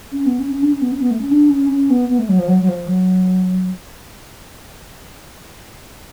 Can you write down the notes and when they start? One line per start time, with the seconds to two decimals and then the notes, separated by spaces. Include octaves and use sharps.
0.12 C#4
0.26 B3
0.40 C#4
0.52 C#4
0.62 D4
0.72 C#4
0.81 B3
0.92 C#4
1.01 B3
1.11 A3
1.21 C#4
1.31 D4
1.50 C#4
1.70 C#4
1.90 B3
2.09 B3
2.19 A3
2.29 F#3
2.39 F3
2.48 F#3
2.62 F#3
2.69 F3
2.88 F#3